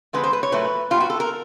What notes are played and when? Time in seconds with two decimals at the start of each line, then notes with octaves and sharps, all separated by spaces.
0.13 D3 F3 G#3 B3 B4
0.24 C5
0.33 B4
0.43 C#5
0.52 A#2 F#3 A3 B4
0.90 A#2 G3 B3 F4
1.00 F#4
1.10 A4
1.20 A#4